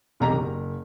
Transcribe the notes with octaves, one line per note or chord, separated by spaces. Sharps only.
E1 B1 E2 C3 G4 A#5
F#1